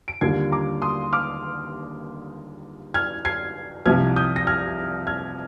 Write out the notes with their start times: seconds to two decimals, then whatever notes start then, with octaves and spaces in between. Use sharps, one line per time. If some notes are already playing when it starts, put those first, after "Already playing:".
0.08 D7
0.21 D#2 D3 G3 A#3 F4 G#6 C7
0.52 A#5 D6
0.82 C6 D#6
1.13 D6 F6
2.94 F6 G#6
3.25 G#6 C7
3.86 C2 C3 F3 F6 G#6
4.16 D#6 G6
4.36 A#6
4.47 F6 G#6
5.07 F6 G#6